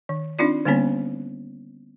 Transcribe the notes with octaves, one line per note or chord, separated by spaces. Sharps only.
D#3
C4 D4 D#4 F4 D5
D3 G3 A#3 B3 C#4 C#5